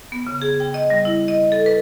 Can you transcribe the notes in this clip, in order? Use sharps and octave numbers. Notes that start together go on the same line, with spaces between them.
B3
C#3
G#4
G5
D#5
G3
E4
D#5
A4
B4